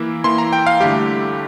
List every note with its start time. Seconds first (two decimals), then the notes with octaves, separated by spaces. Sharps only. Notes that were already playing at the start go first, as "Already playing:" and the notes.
Already playing: E3 A#3 E4
0.24 E3 A#3 E4 C6
0.38 A#5
0.53 G5
0.66 F5
0.80 G2 D3 A3 E4 G4